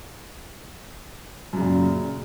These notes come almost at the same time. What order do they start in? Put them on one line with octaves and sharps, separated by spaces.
F#2 C#3 A#2